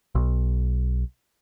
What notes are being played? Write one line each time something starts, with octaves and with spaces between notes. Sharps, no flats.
B1